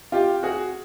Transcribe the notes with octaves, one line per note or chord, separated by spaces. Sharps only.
F4 G4
F#4 G#4